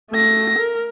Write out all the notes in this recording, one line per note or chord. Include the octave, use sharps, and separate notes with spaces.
A3 A#6
A#4